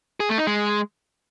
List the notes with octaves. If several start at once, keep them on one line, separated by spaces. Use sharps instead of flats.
G#4
A3
D#4
G#3